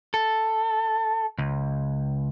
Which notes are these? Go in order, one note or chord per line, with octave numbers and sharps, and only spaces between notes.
A4
C#2